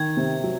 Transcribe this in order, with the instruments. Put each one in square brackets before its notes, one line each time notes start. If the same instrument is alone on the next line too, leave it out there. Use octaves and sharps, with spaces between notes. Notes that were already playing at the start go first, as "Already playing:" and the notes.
Already playing: [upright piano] D#3 [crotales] G#6
[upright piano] C3
F#3